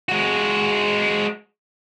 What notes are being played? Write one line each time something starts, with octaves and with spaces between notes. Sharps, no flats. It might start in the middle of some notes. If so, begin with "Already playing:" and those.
G#3 F#4